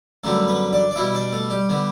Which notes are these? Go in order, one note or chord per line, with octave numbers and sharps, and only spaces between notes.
F#2 D3 G3 A3 B3 A4
B3 B4
D4 D5
D5
B2 G3 B3 E4 E5
D4 D5
A3 A4
G3 G4
D3 G3 B3